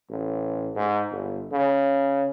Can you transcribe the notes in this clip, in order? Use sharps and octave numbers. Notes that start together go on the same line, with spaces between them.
A1
G#2
G1
C#3